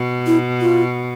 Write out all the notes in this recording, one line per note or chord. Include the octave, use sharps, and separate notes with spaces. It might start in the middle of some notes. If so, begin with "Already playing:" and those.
Already playing: B2
E4
F4